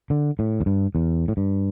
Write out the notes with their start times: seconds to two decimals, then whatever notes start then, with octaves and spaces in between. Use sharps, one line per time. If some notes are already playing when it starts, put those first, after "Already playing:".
0.10 D3
0.39 A2
0.60 E2
0.66 G2
0.95 E2
1.28 A2
1.37 G2